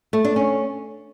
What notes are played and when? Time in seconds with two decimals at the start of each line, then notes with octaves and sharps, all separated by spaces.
0.13 A3
0.25 D4
0.36 C#4